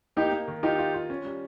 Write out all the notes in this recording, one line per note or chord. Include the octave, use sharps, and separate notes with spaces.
A#3 D#4 G4
A#3
D#3
D#4 F4 G4
F4
F4
C#4
G3